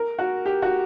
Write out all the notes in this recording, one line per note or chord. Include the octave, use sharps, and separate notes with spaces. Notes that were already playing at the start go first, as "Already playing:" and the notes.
Already playing: A#4
F#4
G4
F#4